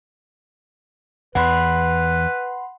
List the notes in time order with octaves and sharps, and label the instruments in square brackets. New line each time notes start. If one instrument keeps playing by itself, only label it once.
[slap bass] E2 E3 [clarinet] B4 [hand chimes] F#5 B5 C6